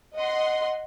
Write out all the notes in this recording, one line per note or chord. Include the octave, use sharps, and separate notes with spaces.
D#5 F#5 C6